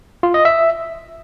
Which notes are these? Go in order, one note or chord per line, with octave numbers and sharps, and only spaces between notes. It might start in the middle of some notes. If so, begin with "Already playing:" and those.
F4
D#5
E5